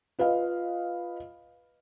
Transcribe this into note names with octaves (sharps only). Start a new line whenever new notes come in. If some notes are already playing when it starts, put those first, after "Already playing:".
F4 B4 D#5 F5